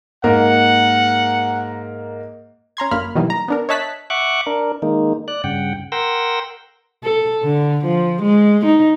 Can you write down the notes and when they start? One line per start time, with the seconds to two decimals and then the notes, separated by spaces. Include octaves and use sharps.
0.24 G#2 A#3 A#4 F#5
2.77 C#4 A#5 C6 G#6
2.91 G1 F#2 D3 A#3 B5 F6
3.15 B2 D#3 E3 F#3 G3 A#3
3.30 A#5
3.48 B3 D4 A#4
3.69 C#5 D#5 E5 A5 F#6 B6
4.10 E5 F#5 C#6 D6 F#6
4.47 D4 A#4
4.82 D#3 G#3 A#3 D#4
5.28 D5 F#6
5.44 G2 C#3 F#5 G5
5.92 A#4 F#5 G5 C6 E6 A#6
7.03 A4
7.43 D3
7.85 F3
8.22 G#3
8.66 D#4